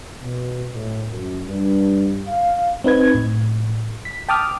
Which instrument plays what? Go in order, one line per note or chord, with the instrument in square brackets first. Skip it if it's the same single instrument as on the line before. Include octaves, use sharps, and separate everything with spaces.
[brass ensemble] B2
A2
F#2
G2
F5
[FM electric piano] C4 D#4 B4 G#6
A2
B6
G5 A5 D6 D#6 F6